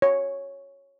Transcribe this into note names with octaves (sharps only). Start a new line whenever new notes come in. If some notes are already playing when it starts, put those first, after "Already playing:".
C#5